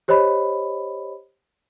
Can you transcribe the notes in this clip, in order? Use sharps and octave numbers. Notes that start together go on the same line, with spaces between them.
G4 C5 C#5 D#5 B5